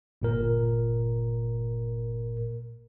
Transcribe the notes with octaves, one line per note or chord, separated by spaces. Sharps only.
G1 A#2 A#4